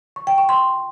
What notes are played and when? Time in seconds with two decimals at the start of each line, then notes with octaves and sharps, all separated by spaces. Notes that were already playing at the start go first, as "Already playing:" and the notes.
0.16 C#6
0.27 G5
0.38 C#6
0.49 C6